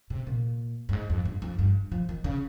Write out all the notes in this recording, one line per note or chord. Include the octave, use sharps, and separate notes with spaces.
C3
A#2
G2
G#2
F2
G2
F2
G2
F3
D#3
C#3